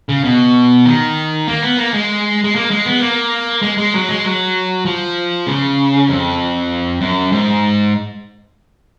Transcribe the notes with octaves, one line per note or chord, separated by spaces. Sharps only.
C#3
B2
D#3
A#3
B3
A#3
G#3
G#3
A#3
G#3
B3
A#3
G#3
G#3
F#3
G#3
F#3
F3
C#3
F2
F#2
G#2